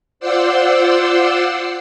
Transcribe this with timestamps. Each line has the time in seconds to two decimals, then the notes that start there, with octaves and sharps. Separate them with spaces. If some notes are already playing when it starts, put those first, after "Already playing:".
0.20 F4 C5 D5 F#5 C6 E6